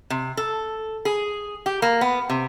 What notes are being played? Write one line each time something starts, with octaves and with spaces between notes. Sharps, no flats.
C3
A4
G#4
G4
A#3
B3
C3